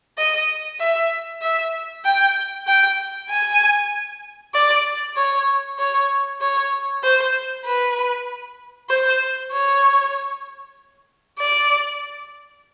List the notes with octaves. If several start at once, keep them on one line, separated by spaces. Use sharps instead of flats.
D#5
E5
E5
G5
G5
G#5
D5
C#5
C#5
C#5
C5
B4
C5
C#5
D5